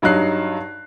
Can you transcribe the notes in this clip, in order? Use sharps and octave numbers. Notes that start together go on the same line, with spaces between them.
G2 F#3 D#4 F#6 C7